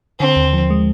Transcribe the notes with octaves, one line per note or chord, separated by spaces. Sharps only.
D3 C4
D#2
F3
G#3